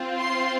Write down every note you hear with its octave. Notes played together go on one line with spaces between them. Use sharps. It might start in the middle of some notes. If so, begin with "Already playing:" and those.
Already playing: C4 F4
C6